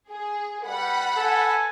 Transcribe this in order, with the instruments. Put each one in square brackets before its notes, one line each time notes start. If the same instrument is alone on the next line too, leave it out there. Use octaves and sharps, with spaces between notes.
[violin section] G#4
[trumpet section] G3 B4 [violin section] F#5 B5
[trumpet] A4 [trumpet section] B4 G#5